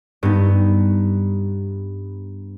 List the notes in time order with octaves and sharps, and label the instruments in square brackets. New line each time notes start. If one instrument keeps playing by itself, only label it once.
[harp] G2 B3 D#4